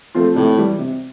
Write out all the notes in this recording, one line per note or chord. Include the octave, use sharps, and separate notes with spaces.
F3 A3 C4 F4
A2 C3
E3 G3
C3